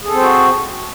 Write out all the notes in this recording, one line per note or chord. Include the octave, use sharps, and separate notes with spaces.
C4 F#4 G#4 A4 C5